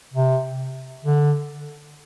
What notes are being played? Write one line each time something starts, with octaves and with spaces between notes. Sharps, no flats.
C3
D3